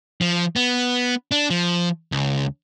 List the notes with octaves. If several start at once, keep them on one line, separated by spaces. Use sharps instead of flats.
F3
B3
D4
F3
C#2